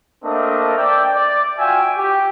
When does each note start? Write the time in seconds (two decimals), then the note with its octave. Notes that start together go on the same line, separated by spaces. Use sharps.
0.24 A3 A#3 C4 D4 A#4 D#5
0.76 D5 E5 G5
1.15 D5
1.58 F4 F#4 E5 G5 G#5
1.97 G4